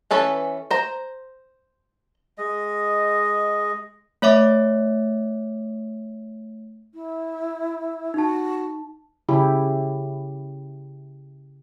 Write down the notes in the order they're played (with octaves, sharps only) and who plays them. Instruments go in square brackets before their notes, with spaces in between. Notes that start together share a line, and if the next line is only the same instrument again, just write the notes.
[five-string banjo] E3 C#4 A4 B4
C5 A#5
[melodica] G#3 D#5
[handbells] A3 C#5 E5 D6
[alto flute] E4
[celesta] D#4 A5 [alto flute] F#4
[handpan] C#3 E4 G4